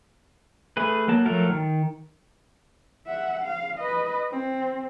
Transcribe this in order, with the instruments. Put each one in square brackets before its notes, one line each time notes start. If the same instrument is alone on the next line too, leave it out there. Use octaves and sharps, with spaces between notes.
[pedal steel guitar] A3 G#4 B4
F#3 A#3 A5
F3 F#3 A3 A4 A#4
D#3
[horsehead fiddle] E5 F#5
F5
B4 D#5
C4